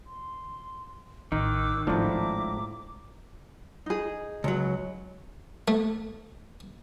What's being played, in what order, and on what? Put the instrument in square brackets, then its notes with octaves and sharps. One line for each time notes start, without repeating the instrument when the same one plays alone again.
[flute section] C6
[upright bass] A1 [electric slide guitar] D#3 [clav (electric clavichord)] D#4 [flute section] D6 E6 F#6
[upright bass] G#1 G#3 [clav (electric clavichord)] A2 F3 D4 [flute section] E4 A#5 D6
[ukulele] D#4 G#4
[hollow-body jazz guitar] C#2 F#3
[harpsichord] A3